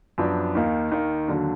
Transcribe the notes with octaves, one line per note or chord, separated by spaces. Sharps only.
F#2 F3 B3 D4
D#2 D#3 A#3 D#4
D#2 D#3 A#3 D#4
D#2 D3 F#3 D4